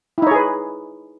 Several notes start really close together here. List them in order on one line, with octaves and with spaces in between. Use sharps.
E4 D#4 C#5 G#4 B4